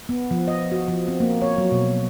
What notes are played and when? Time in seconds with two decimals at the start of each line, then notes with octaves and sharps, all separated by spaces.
0.09 B3
0.31 F3
0.48 D#5
0.72 F#4
0.88 F3
1.08 C4
1.20 A#3
1.42 C#5
1.58 F#3
1.72 B2